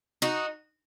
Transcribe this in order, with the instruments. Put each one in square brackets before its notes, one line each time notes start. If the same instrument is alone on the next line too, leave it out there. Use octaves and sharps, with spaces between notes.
[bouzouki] D#4 F#4